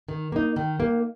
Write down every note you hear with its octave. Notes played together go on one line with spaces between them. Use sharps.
D#3
A#3 D#4
D#3
A#3 D#4